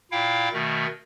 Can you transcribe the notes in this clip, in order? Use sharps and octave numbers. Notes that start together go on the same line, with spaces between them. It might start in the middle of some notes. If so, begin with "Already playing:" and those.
A#2 E4 F5 G5
B2 D#3 A3